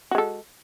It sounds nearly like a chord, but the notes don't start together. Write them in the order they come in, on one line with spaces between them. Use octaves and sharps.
F#4 G#3 A4